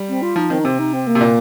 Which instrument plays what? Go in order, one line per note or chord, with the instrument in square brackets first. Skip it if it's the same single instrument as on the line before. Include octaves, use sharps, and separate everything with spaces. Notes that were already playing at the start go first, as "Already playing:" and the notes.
Already playing: [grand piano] G3
[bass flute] C4
F4
[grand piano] F3 [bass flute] D#4
[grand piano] D#3 [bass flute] C4
[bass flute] D#4
[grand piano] C3 [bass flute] C4
[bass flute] D#4
C4
A#3
[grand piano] C3
A#2